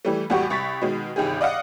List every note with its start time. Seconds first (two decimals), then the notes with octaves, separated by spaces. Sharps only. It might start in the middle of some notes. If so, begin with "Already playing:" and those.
0.05 E3 G3 A3
0.30 E2 A2 G3 F#4 G4 C#6
0.50 C2 C#6 A6 B6
0.82 B2 D#3 G#3
1.16 G1 C2 D#3 G4 G#4
1.41 D5 D#5 F5 F#5